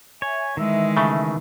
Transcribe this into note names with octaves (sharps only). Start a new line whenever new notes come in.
C#5 E5 G#5
D#3 E3 G#3 E5 E6
C#3 A3